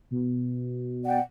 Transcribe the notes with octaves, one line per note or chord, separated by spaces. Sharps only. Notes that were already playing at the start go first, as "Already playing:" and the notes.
B2
D5 F#5 G5